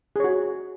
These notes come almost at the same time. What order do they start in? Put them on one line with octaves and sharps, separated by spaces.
G#4 C#5 F#4